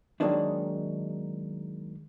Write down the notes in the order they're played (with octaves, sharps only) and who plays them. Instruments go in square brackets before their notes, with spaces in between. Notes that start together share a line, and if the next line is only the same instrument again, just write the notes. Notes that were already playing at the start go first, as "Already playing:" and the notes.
[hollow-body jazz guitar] D#3 F#3 G#3 A#3 D4 D#4